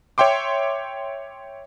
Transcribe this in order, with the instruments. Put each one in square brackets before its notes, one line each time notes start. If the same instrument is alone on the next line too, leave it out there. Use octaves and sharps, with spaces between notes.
[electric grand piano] C#5 E5 G5 C6 D6